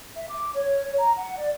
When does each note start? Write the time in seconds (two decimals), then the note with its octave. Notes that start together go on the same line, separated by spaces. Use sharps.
0.15 E5
0.29 D6
0.54 C#5
0.99 A#5
1.18 F#5
1.36 D5